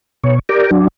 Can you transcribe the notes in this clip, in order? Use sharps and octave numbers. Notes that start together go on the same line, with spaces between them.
B2 C#5
G4 A#4 D5
F#3 D4